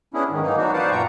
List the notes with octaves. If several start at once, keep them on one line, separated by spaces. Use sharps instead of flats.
B3 C#4 D4 E4 G#4
G#2 D#3
E3 F#3 A#3 D#4
E3 F#3 B3 D4 D#4 F#4
B4 C5 D5 F5 F#5 A5
F#2 A#2 B3 G5 A#5 C#6